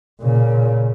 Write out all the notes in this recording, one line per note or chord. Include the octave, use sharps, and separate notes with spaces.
A#2 C#3